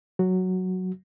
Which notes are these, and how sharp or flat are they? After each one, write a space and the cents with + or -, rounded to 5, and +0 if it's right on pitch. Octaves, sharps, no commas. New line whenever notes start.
F#3 +0 F#4 +0